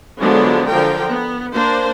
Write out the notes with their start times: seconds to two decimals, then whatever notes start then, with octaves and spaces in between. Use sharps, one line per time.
0.21 D3 F3 F#3 G#3 B3 D4
0.68 D3 F3 A#4 G5
1.10 B3
1.54 A#3 D4 C5